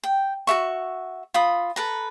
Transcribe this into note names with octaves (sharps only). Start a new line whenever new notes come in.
G5
F#4 A4 E5 C#6
F4 B5 D#6
A4 B4 A#5